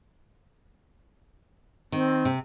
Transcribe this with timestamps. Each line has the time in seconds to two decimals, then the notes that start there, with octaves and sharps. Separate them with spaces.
1.92 D#3 C4
2.25 C3